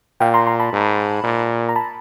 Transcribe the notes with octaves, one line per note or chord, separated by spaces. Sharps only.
A#2 F5 G5
A#5 C6
A#5 C6
A5 B5
G#2
A#2
A#5
A5 B5